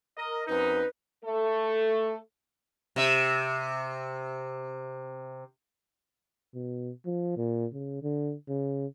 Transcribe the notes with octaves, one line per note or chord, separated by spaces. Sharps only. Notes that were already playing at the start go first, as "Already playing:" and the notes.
A#4 D#5
F#2 C4 D#4 B4
A3 A4
C3 E5
B2
F3
A#2
C#3
D3
C#3